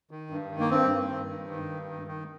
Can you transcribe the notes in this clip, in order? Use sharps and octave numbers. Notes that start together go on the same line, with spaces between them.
D#3
G2
D#3
A#3
G2 C4
G2
D#3
G2
D#3
G2
D#3
D#3